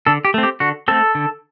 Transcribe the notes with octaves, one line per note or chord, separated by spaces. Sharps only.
D3 A4
G4
A3 C4
G4
D3 F#4
A3 C4 A4
D3